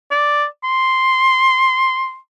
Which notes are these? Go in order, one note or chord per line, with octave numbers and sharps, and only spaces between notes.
D5
C6